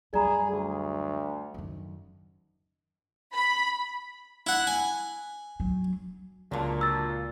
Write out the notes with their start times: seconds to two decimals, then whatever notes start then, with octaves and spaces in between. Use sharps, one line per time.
0.13 F#2 G3 G#4 D5 A#5 B5
0.51 D2
1.54 F#2 D#3
3.34 B5
4.47 E4 F#5
4.67 G#5
5.60 F#3
6.52 C#2 A#2 D3 F#3
6.81 E6 A6